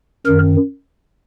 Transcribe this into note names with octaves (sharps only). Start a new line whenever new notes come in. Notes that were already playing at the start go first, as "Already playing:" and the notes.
F#2 D#3 A#4